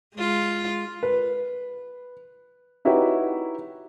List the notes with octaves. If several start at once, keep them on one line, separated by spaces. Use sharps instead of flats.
G#3 F4
B4
D#4 E4 F#4 G4 B4 C#5